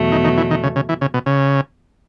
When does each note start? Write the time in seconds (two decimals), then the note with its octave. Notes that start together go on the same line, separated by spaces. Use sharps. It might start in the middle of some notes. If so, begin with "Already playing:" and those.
Already playing: E2 B2 F#3 A3
0.12 D#3
0.24 D#3
0.37 E3
0.51 D#3
0.63 C#3
0.76 C#3
0.89 E3
1.01 C#3
1.14 B2
1.26 C#3